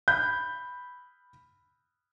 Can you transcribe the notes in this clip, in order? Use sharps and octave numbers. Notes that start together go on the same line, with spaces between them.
B5 G6